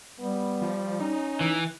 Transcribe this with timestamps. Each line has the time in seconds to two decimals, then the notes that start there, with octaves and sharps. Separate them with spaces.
0.19 G3 B3
0.62 F3
1.00 C#4 D#4
1.41 E3